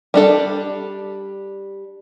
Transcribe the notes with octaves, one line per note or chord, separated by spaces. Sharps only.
G3 D4 A4